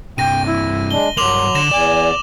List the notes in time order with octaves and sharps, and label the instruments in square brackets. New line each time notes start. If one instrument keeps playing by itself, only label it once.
[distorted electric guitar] G2 C3 [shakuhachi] G5 [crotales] A#6 D#7
[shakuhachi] E4
[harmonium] G#3 D4 [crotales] G7
[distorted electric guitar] G2 A#3 [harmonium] F#3 [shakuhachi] C6 [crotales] D6 F7 F#7
[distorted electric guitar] D3 [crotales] A#6 E7
[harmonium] E2 [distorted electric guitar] D5 [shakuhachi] G#5